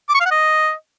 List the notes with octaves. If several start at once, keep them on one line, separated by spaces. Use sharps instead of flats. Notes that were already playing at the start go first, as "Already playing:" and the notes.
D6
C#6
F5
F#5
D#5